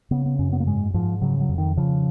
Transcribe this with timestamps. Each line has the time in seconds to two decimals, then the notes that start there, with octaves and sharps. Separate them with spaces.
0.11 C#3 B3
0.26 B3
0.39 F#2 C#4
0.53 B3
0.60 A#3
0.66 G#2 G#3
0.94 G#2 F3
1.21 C#3 F#3
1.40 F#3
1.49 F2
1.58 D#3
1.77 C#3 F3